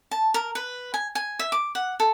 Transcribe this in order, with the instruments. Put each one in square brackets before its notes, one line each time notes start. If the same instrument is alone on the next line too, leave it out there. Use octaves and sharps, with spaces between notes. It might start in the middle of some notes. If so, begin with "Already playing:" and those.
[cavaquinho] A5
A#4
B4
G#5
G#5
E5
D6
F#5
A4